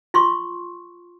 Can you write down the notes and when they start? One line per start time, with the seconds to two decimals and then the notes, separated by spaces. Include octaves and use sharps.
0.14 F4 C6 C#6